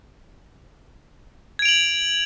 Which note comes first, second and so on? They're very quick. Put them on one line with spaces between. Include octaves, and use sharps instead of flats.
G#6 D7 F7 F#7